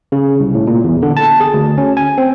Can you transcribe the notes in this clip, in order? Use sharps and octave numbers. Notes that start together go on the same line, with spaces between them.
C#3
C2
A2
A#2
E2
D3
A5
G#4
D2
C#4
G#5
C4